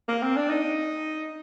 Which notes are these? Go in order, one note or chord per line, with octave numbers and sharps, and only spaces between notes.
A#3
C4
D4
D#4